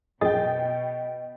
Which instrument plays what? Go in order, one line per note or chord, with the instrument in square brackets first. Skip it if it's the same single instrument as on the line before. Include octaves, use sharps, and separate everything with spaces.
[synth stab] A#1 F#2 G#4 [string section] B2 [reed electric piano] D#5 [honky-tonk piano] G5 A6